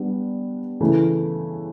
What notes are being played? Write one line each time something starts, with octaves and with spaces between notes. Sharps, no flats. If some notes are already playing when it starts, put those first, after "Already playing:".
Already playing: G3 B3 D4
C#3 E3 A3 E4